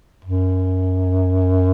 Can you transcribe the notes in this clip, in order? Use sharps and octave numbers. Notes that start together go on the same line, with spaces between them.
F#2